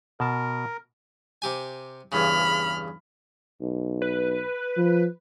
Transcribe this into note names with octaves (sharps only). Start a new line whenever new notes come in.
B2 A#4 A5
C3 G4 G#5
E2 G2 C#3 B5 F6
B1
B4
F3